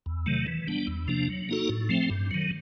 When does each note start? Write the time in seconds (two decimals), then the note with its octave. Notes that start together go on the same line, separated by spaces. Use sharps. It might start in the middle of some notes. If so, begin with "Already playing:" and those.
0.06 E2
0.26 C3 D#3 F#3 A3
0.47 E3
0.68 G3 B3 D4
0.87 E2
1.08 C3 F3 A#3 D4
1.29 F#3
1.49 A#3 D#4 F#4 A4
1.69 A2
1.89 F3 A3 C4
2.10 G2
2.31 D#3 F#3